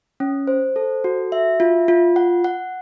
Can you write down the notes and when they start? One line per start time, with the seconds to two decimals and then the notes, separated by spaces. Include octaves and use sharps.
0.20 C#4
0.47 C5
0.76 A4
1.04 F#4
1.32 E5
1.60 F4
1.88 F4
2.16 F#5
2.44 F#5